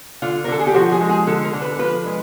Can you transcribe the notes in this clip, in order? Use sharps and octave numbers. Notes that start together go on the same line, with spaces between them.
D3 F4
A#4
D3 A4
G#4
G4
F3 F#4
G#4
G#3
G#4
D3 A4
A#4
D3
B4
F3 B4
G#3